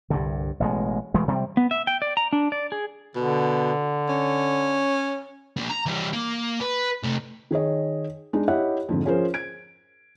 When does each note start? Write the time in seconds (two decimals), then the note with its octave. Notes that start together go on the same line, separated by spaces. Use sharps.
0.10 C2 G2 D3
0.60 A1 B2 G#3
1.14 E1 E3 G#3 A3
1.28 C3 G3 C4
1.57 B3
1.71 E5
1.87 G5
2.02 D5
2.17 A#5
2.33 D4
2.52 D5
2.72 G#4
3.16 B2 D3
4.09 C#4
5.57 A#3 D4
5.70 A#5
5.86 E3 G3
6.13 A#3
6.61 B4
7.04 C3 A3
7.51 D#3 G#4 C#5 D#5
8.33 G#3 D4 D#4
8.48 E4 G4 C#5 D#5 E5 F#5
8.89 F2 G#2 D3
9.05 F3 C#4 G#4 A#4 C5
9.34 G#6 D7